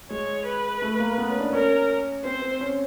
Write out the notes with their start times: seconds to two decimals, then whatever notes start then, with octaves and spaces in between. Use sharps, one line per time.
0.10 G#3 C#5
0.46 B4
0.82 A3
1.00 A#3
1.18 B3
1.29 C#4
1.41 D4
1.53 C#4 A#4
2.24 C4 C5
2.42 C4
2.61 C#4